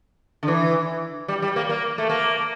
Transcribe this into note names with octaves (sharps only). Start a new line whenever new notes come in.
D3
E3
G3
G3
A#3
A#3
A3
A#3